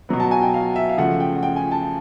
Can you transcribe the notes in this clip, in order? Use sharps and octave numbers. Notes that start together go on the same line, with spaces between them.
B2 F#3 B3
A5
G#5
G5
F5
E5
F5
C#3 F3 A3 F#5
G5
F#5
G5
G#5
A5